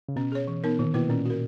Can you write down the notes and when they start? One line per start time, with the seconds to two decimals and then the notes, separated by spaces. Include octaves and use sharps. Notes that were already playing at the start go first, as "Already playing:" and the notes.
0.09 C#3
0.16 B2 C#4
0.32 G#4 C#5
0.48 E3
0.64 B3 D#4 A#4
0.79 A#2 D#3
0.94 B2 A#3 E4 B4
1.09 A#2 C#4
1.25 F#4 A#4